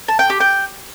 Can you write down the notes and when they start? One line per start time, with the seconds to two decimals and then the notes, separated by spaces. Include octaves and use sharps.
0.08 A5
0.19 G5
0.30 G4
0.40 G5